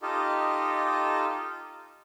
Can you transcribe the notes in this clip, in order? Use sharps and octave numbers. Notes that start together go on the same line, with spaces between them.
D#4 F4 G4 A4 D#5